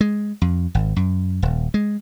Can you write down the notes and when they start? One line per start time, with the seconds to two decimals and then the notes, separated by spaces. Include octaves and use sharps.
0.01 G#3
0.42 F2
0.75 G#1
0.96 F#2
1.42 D#1
1.74 G#3